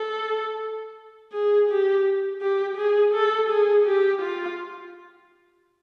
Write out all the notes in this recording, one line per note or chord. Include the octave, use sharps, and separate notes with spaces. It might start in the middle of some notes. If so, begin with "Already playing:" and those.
Already playing: A4
G#4
G4
G4
G#4
A4
G#4
G4
F4